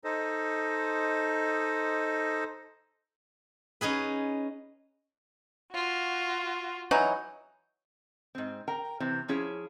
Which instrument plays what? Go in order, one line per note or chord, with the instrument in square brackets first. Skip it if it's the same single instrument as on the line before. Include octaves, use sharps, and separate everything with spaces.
[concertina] D#4 A4 C5 D#5
[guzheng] C#4 D#4 G#4 B4
[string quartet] F4 F#4
[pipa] E3 F#3 D#4
[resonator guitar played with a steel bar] G#2 C4
A#4 G5 A#5
C3 E3 C4
F3 C#4 E4 G#4 C#5